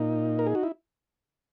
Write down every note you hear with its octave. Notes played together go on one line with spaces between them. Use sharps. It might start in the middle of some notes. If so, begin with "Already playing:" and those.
Already playing: A#2 D#4
A#4
G#4
F#4
E4